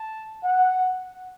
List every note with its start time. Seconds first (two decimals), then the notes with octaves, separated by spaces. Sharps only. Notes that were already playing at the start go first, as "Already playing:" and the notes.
Already playing: A5
0.44 F#5